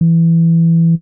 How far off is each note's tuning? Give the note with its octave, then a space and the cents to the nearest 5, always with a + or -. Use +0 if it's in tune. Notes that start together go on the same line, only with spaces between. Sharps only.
E3 +10